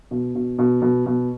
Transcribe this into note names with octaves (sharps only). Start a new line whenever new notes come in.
B2
B2
B2
B2
B2